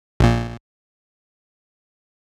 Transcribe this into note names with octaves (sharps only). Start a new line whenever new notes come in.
A#1 A#2